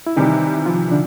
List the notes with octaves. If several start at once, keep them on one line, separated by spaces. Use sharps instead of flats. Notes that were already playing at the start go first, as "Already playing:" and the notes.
E4
C3 D#3 E3 G3 D#4
F3 F4
D3 D4